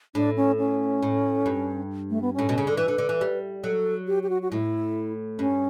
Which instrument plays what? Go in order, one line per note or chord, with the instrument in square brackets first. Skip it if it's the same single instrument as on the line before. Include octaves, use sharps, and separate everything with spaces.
[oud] A2 [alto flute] D4
[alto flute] C#4
C#4
[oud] A2
G2
[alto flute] A3
B3
C#4
[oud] A2
B2
C#3
[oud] D3 [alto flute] A4
[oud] E3 [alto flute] B4
[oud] D3
D3
E3
G3
[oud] F#3 [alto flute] A4
[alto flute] G4
G4
F#4
F#4
[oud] A2 [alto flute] E4
[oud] G2 [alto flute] C#4